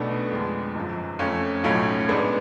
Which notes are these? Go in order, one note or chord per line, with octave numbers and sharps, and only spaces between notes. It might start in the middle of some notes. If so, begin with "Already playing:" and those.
Already playing: B1 B2 A3 B3 D4
F2 D3 G#3
G#1 F#2 F3
F2 F3 A3 C#4 F4
B1 A2 F#3 A3 C#4 F4
A1 G#2 G#3 B3 D4